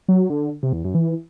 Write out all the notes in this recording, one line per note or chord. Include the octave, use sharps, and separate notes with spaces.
F#3
D3
C3
E2
F#2
E3